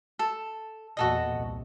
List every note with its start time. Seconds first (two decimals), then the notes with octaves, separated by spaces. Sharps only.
0.19 A4
0.97 E2 A#2 F#4 A4 D#5
1.32 C2